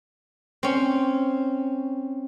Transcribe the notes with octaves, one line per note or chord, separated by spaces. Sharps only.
C4 C#4